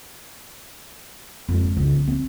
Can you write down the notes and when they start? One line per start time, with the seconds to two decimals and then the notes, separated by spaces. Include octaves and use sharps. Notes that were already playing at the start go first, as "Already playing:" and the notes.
1.49 F2 G#3
1.64 G#2
1.77 C#2
1.93 C#4
2.07 C4